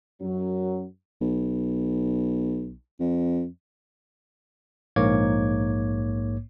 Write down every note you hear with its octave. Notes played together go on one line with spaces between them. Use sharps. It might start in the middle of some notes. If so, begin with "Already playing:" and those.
F#2 F#3
B1
F2
A#1 G#2 A#3 C#5 D6 G#6